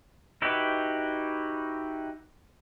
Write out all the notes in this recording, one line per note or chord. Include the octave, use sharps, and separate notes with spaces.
D#4 E4 F#4 G4 B4